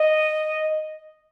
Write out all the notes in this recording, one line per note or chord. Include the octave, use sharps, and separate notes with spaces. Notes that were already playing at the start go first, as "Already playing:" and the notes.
Already playing: D#5